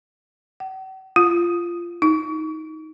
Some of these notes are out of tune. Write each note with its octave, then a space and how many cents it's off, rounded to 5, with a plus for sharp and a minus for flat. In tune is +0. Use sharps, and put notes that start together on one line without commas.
F#5 +45
F4 -15
D#4 +15